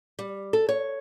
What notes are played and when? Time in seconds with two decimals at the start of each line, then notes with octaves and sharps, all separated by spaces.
0.19 G3
0.53 A4
0.69 C#5